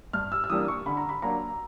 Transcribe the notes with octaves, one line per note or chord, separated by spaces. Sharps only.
G2 F6
E6
E6
E3 G3 A#3 D4 D#6
C#6
D3 B5
A#5
B5
F#3 A#3 D4 A#5